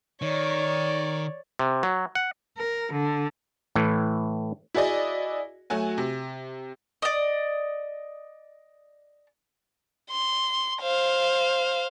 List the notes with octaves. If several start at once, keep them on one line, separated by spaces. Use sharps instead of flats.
D#3 C#5 D5
C3
F#3
F#5
A#4
D3
A2 E3
E4 F#4 G#4 D5 D#5
F#3 A3 F#4 G#5
C3
D5 D#5
C6
C5 F5